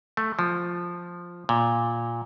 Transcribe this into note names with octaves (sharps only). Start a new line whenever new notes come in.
A3
F3
A#2